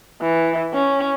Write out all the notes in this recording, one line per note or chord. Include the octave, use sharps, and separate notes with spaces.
E3
C#4